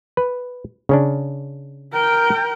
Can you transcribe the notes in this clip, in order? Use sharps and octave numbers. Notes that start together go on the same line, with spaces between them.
B4
C#3 C#4 D4
A#4 G5